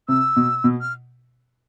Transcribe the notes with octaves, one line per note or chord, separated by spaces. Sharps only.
C3 E6
B2
B2
F6